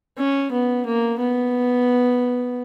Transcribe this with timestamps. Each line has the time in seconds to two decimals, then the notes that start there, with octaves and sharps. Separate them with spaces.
0.18 C#4
0.52 B3
0.86 A#3
1.20 B3